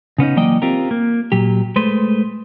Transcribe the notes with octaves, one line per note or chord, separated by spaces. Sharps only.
C#3 B3 C#4 D#4
E3 F#3 A#3 D5 D#5 G5
C4 F4 G4 A#4
A#3
A#2 F#3 G4
G#3 A3 B4 C5